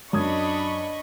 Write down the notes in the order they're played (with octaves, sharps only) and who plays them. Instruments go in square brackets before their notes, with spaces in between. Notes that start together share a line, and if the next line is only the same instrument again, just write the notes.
[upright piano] F#2 D#6 G#6 [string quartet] D4 [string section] D#5 B5 C#6